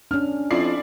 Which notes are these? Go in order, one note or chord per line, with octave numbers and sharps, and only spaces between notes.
C#4 D4 F6
F2 E4 D5 C7